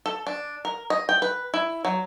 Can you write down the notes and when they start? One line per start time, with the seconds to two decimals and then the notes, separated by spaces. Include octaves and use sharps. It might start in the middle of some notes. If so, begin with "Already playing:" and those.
0.06 A4
0.27 D4
0.65 A#4
0.90 D#5
1.09 G5
1.22 B4
1.54 E4
1.85 F#3